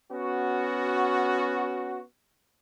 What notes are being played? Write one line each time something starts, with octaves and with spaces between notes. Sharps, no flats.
B3 C#4 F#4